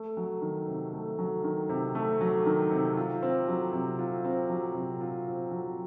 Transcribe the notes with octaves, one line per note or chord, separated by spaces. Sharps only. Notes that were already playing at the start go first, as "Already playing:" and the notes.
Already playing: A3
F#3
D#3
C3
A3
F#3
D#3
C3
A3
F#3
D#3
C3
F4
C4
F#3
C3
F4
C4
F#3
C3
F4
C4
F#3